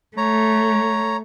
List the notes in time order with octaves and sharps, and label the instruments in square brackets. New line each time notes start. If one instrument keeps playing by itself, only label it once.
[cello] A3 [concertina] C#5 A#5